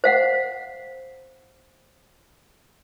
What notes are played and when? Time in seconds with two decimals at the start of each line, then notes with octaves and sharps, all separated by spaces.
0.04 C5 F5 F#5